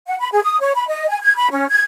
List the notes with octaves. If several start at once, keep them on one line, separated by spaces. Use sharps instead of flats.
F#5
B5
G#4
D#6
C#5
B5
D#5
G#5
G#6
B5
C#4
G#6